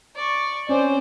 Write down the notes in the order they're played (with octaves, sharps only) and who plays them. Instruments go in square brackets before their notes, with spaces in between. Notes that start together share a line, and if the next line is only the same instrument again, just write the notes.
[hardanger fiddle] D5 C#6
[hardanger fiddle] C4 C5 [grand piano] C#4 [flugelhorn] D5